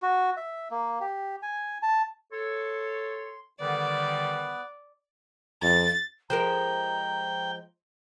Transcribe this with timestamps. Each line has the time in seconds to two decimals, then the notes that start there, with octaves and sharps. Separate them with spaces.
0.02 F#4
0.37 E5
0.71 A#3
1.01 G4
1.43 G#5
1.83 A5
2.32 A4 C#5 C6
3.60 D3 D#3 G3 B3 B4 D5
5.63 F2 A6
6.30 F3 G#3 A#4 G5 A#5